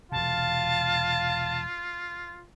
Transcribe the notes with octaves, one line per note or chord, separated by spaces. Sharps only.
E1 C3 F4 F5 A5